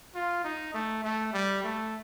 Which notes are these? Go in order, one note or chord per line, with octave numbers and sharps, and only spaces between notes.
F4
D#4
A3
A3
G3
A3